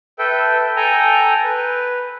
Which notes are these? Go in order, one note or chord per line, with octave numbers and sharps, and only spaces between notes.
A4 B4 E5 G5
A4 G5 G#5 A#5
B4